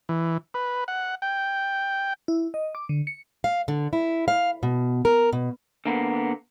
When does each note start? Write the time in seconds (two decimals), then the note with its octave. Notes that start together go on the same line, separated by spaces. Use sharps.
0.09 E3
0.54 B4
0.88 F#5
1.22 G5
2.28 E4
2.54 D#5
2.75 D6
2.89 D3
3.07 C#7
3.44 F5
3.68 D3
3.93 E4
4.28 F5
4.63 B2
5.05 A#4
5.33 B2
5.86 D3 A#3 B3